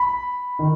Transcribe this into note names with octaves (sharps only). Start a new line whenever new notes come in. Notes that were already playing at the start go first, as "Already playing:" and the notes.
Already playing: B5
D#3